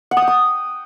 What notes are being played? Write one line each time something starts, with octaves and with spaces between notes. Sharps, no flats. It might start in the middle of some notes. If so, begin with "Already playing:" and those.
F#5
D#6
G5
D#6